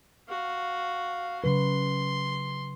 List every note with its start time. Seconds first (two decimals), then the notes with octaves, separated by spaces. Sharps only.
0.29 F#4 F5
1.44 C#3 F#3 B4 C6